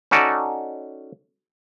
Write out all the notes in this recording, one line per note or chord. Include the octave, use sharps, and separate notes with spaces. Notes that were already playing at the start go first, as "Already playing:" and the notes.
C#4 D#4 F#4 A4 D5